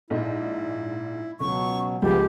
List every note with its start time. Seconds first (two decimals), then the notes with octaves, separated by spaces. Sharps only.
0.10 A#1 G#2 E4 D#5
1.40 C#2 B2 F#3 C#6
2.02 C#2 F3 A#3 B3 G4